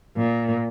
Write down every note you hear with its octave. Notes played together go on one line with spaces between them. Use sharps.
A#2